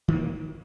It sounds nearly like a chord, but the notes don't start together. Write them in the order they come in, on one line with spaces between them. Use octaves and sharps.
D#3 E3 A#3